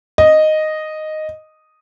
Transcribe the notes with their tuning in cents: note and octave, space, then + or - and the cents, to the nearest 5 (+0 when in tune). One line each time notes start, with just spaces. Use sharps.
D#5 -5